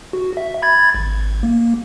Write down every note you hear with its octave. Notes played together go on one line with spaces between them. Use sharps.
F#4
E5
B5 G#6 A6
G#1
A#3